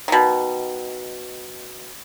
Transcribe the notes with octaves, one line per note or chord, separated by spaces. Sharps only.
B2 D#3